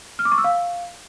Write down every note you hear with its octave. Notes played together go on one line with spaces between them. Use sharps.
F6
D6
C#6
E6
F5